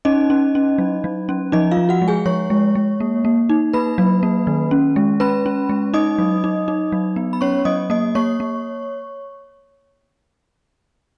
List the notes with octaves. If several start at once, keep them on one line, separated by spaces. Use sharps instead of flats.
C#4 D#4 D#5
C#4
C#4
F#3
F#3
C#4
F3 D#4 D#5
F4 F5
F3
F#4 F#5
G#3
G#4 G#5
F3 C#5 C#6
G#3
G#3
A#3
A#3
D#4
A#3 B4 B5
F#3
A#3
D#3
C#4
G#3
C#4 B4 B5
C#4
G#3
D#4 D#5 D#6
F#3
D#4
D#4
F#3
B3
B5
C#4 C#5 C#6
F#3 D#5 D#6
A#3 D#5 D#6
A#3 C#5 C#6
A#3